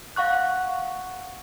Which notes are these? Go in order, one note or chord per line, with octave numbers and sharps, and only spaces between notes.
F5 F#5 C#6 F#6